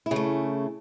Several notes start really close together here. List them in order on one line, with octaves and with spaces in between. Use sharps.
E4 C#3 A3